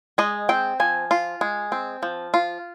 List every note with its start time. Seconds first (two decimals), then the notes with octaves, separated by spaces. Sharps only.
0.18 G#3 D#5
0.49 C4 G5
0.80 F3 G#5
1.11 F4
1.41 G#3
1.72 C4
2.03 F3
2.34 F4